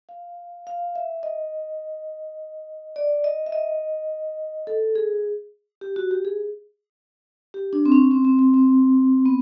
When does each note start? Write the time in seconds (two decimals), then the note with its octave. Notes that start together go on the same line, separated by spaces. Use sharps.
0.09 F5
0.67 F5
0.96 E5
1.23 D#5
2.96 D5
3.24 D#5
3.46 E5
3.52 D#5
4.67 A4
4.96 G#4
5.81 G4
5.96 F#4
6.11 G4
6.25 G#4
7.54 G4
7.73 D4
7.86 C4
7.92 C#4
8.11 C4
8.25 C4
8.39 C4
8.54 C4
9.26 B3